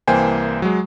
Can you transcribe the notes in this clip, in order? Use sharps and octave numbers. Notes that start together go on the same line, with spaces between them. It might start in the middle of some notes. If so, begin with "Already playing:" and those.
C2 E3 A#3 C5 G5 G#5
F#3 G#3